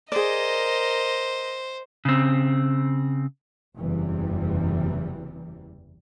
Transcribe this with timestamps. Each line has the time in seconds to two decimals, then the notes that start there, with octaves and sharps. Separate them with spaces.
0.12 G#4 A#4 C5 D5 D#5
2.05 C#3 C4
3.76 F#1 E2 C3 E3 G3